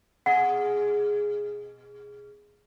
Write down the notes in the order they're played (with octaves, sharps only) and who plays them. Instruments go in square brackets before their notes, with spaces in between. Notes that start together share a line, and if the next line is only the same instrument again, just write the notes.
[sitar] B2 G#4 D#5 [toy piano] F#5